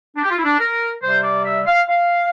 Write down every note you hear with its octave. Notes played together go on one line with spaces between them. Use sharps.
D4
G4
F4
E4
D4
A#4
C3 G3 C5
D5
E5
F5
F5